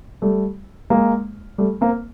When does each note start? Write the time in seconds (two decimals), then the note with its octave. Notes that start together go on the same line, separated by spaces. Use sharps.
0.22 G3 A3
0.90 G#3 A#3
1.58 G3 A3
1.81 A#3 C4